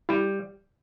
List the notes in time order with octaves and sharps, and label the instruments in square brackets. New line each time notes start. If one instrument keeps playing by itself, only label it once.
[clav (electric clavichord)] G3 [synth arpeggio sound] E4